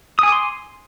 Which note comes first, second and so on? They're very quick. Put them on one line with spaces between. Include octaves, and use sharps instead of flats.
D#6 G#5 D6 C6